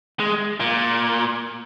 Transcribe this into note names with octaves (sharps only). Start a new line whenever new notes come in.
G#3
A#2